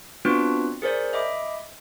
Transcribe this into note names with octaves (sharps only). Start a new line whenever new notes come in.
B3 C4 D4 F4 F#4 B4
G#4 A#4 C5 D5
D#5 E5 B5 D6